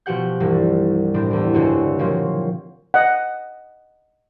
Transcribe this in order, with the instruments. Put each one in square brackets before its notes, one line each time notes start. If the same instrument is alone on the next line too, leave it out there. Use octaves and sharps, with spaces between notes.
[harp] B2 F3 F#4 G4 F#5 G6
C2 G2 C3 E3 G3
A2 C3 C4 D4
E2 E3
C#2 G2 D3 C4 F#4
A#2 F3 F#3 A#3 C4
[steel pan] D#5 F#5